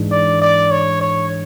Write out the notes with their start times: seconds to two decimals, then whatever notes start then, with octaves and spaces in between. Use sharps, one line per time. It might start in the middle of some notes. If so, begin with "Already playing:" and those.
Already playing: G#2 E3 G#3 D4
0.11 D5
0.41 D5
0.71 C#5
1.01 C#5